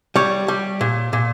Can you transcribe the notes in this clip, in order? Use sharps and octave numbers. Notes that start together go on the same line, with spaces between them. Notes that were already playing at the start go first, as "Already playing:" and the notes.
G3 C#5
G3
A#2
A#2